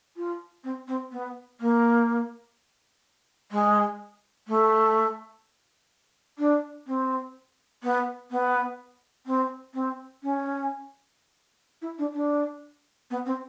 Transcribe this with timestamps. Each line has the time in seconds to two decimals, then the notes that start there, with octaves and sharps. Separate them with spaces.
0.17 F4
0.64 C4
0.88 C4
1.12 B3
1.61 A#3
3.52 G#3
4.48 A3
6.39 D4
6.87 C4
7.84 B3
8.31 B3
9.26 C4
9.74 C4
10.23 C#4
11.82 E4
11.99 D4
12.14 D4
13.10 B3
13.26 C4